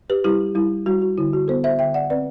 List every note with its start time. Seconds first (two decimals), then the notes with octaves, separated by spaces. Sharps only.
0.10 G4 B4
0.24 G3 E4 G4
0.55 G3 E4
0.86 G3 F#4
1.02 F#4
1.18 D3 E4
1.33 F#4
1.48 B3 A4 C5
1.64 C5 E5
1.79 D3 E5 G5
1.94 D5 F#5
2.10 C4 B4 D5